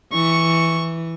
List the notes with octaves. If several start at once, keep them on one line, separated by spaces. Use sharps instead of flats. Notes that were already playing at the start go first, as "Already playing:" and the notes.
E3 C#6